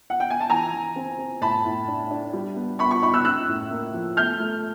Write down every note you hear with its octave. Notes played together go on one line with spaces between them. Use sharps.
F#5
G5
G#5
A5
E3 G#5 A#5
E3
C4
C4
A2 A5 B5
A2
D4
D4
G3
B3
B3 B5 C#6
B5 C#6
D#4 B5 C#6
E6 F#6
C#4 E6 F#6
A2
A#3
F3
A3 F6 G6
A3